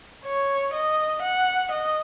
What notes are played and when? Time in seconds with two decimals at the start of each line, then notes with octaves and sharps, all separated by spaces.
0.25 C#5
0.74 D#5
1.22 F#5
1.71 D#5